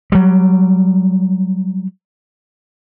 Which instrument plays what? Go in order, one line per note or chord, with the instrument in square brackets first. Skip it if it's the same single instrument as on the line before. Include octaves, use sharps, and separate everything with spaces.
[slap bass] F#3 G3